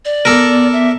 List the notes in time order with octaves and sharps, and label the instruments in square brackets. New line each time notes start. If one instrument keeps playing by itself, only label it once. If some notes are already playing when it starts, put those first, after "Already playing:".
[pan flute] D5
[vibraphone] B3 D6 [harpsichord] A4 A#4
[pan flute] E5